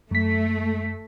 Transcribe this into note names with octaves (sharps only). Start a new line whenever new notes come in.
F#2 A3 B6